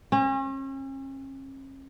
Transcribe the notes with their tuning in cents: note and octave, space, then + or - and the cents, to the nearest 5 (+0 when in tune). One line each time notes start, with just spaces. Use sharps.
C#4 -40